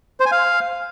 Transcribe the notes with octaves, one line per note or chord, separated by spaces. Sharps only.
C5
G#5
F5